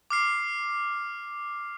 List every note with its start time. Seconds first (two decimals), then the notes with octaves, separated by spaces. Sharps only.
0.10 D6 F6 C7